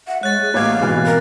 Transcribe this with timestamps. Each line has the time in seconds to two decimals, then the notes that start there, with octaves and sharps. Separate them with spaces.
0.07 E5 F#5
0.23 G#3 C#5 F#6 A6
0.41 G#4
0.54 A1 A#3 F5 D6 G#6
0.80 G#2 B2 E3 B4
1.06 C4 A#4